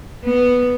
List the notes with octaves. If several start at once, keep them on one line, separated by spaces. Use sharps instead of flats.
B3